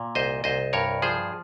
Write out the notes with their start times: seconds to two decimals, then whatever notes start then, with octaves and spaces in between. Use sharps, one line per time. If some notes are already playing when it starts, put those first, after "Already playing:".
Already playing: A#2
0.15 C2 C5 D#5
0.44 C2 C5 D#5
0.73 G2 A#4 C#5
1.02 F3 G#4 C5